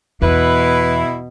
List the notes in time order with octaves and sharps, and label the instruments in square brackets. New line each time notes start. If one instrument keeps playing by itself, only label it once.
[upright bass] E2 [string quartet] B2 [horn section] E4 [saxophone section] B4